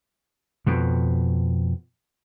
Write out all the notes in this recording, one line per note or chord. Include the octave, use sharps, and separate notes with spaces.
F2 B2